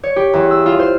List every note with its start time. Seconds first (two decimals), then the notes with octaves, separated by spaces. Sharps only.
0.03 C#5
0.16 G4
0.34 E2
0.51 E6
0.66 F4
0.79 C5